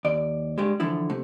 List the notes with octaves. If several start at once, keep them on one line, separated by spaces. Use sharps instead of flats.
D#2 D5
G2 G3 G#3
D3 E3 F3 E4
C3 A3